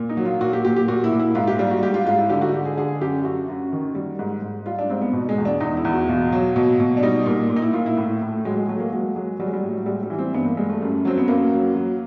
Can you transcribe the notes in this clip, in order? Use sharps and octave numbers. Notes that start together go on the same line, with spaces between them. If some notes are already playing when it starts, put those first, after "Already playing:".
Already playing: A#2
D#4
F#3
F4
A#2 F#4
G4
A#2 G4
G4
A#2 F#4
E4
A#2
E4
G#2 F4
G4
G3 F4
F#4
G#2 G4
F4
G#2 F4
E4
D3 G4
F#4
D3 G4
G#4
D3 G#4
F#2 G4
F#2 F#4
F#2
D#3
G3
G#2
G#2
G3 F4
D4
G#2 C4
B3
B2
G#3
E2
D4
E2 D#4
E4
E2
F#4
B2 F4
F#3
B2
B2
D4
G3 D#4
A#2
A#2
D#4
E4
A#2 F4
E4
A2
A2
A3
F#3 G#3
G#3
F#3 A3
A#3
F#3 G#3
F#3 G#3
F#3 G3
G#3
G3
A2
G3 G#3
G3
E3
C4
G2 B3
A#3
G3 G#3
A3
F#2
F#3 C4
B3
F#2 A#3
F#3
F#3